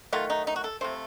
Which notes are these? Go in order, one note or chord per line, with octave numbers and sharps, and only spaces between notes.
D#3 F#3 A3 F4
D#4
D#4
F#4
A4
C3 F3 A3 C5